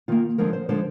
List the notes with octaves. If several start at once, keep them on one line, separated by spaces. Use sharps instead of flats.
D#3 A#3 F4
D3 F3 G#3 A#4
C5
D3 F3 G#3 C5